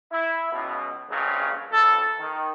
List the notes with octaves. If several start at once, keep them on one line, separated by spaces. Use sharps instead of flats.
E4
C#2 B2
A#1 G2 C#3 F#3 G#3
B1 F2 A4
D#3